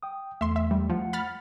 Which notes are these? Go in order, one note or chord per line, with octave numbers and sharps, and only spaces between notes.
G5 D#6
E2 A3 E5 C6
E5
G3
F3 F#5
B5 F6 A6